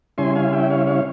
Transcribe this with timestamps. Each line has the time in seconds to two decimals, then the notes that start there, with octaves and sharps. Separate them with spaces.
0.18 C#3 G3 C#4 E4 G#5 C6
0.35 F5 G#5
0.52 E5 G5
0.70 C#5 F5
0.87 C#5 F5